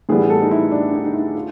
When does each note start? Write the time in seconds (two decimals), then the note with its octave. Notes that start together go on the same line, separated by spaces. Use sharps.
0.09 A2 E3 G3 B3 G#4
0.30 A4
0.42 D#4
0.51 E4
0.72 D4
0.93 D#4
1.05 D#4
1.14 E4
1.35 F4